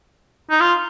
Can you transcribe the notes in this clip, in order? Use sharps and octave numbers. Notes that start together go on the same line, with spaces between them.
D#4
F4